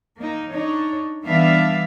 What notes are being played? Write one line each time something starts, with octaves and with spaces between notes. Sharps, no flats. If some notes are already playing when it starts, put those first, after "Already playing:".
A#3 D#4
D4 D#4 C#5
E3 G3 B3 D4 E5 F5